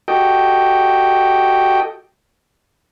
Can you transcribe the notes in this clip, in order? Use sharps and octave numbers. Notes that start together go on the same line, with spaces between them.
F#4 G4 A4 D#5 G5